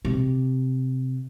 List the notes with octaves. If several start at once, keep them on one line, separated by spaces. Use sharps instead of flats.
C3